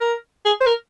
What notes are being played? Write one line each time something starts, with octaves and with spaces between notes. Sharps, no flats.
A#4
G#4
C5
A#4